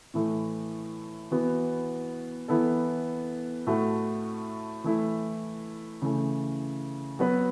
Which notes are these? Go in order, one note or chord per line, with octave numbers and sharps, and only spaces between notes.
A2 E3 A3
E3 B3 F#4
E3 B3 E4 A4
A2 A3 F#4
E3 A3 E4
C#3 E3 A3
F#3 B3 F#4 B4